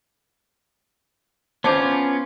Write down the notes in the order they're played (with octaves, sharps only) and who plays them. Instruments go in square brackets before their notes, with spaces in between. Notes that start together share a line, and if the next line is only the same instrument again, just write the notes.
[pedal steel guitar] B3 C#4 F4 [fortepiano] C5 A5 D6